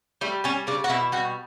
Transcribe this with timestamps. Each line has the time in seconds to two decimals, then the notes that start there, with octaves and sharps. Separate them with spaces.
0.21 G3 A3
0.44 G3 C#4
0.67 C#3 D4
0.84 F#4
0.90 B2 E4
1.12 G3 F#4